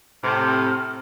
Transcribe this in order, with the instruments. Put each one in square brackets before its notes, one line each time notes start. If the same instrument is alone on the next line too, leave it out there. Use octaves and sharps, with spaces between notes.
[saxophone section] A2 C3 [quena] F6